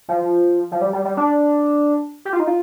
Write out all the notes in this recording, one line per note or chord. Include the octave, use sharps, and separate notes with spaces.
F3
F3
G3
G3
G3
D4
G4
F4
D#4
F4